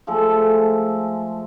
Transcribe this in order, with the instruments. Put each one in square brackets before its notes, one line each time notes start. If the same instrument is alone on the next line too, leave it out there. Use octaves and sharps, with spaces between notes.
[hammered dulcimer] F3 G#3 A3 A4